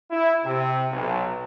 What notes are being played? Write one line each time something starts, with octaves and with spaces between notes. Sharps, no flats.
E4
C3
B1